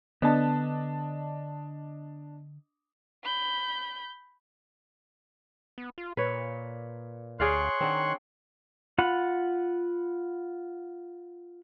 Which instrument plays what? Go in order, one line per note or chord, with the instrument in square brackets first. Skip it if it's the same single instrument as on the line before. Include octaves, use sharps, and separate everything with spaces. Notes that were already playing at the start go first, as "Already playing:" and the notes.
[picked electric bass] D3 [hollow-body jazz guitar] B3 [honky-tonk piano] D4 D#5 A5
[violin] B5 G6
[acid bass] B3
F4
[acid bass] A#2 [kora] B4 C#5
[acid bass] D2 [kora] G#4 D5 F5 [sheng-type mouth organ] C#5 C6 F#6
[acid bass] D#3 [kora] C4 D4 F#5
[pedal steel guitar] F4 F#5 B5